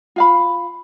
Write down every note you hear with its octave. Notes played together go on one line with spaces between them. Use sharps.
F4 F5 B5